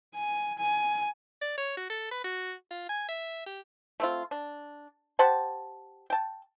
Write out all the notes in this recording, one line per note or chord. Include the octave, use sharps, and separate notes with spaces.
G#5
G#5
D5
C#5
F#4
A4
B4
F#4
F4
G#5
E5
G4
A3 C4 F4
D4
G4 C5 F#5 A5
G5 A5